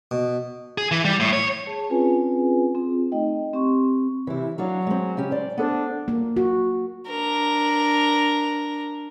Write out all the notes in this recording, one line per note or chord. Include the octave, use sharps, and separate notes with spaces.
B2
G#4
E3
G3
A2
C#5
G#4 C#5 A5
C4 C#4 F4 G#4 B4 G#5
C4 F4 G#4
A3 D#4 D#5 G5
C4 G4 C6 C#6
C3 E3 E4
F#3 D4 F#4 F5
G#3 C4
C#3 C#4 G4
C5 D5
B3 D4 A4 C5
A#3
F#4
D4 A#4